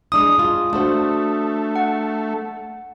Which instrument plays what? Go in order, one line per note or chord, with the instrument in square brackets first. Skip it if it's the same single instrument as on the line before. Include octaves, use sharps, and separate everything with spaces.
[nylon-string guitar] G#3 D4 E4 [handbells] D#6
[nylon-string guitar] G#3 F4
[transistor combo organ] A3 [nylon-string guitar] D4 F#4 C5
[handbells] F#5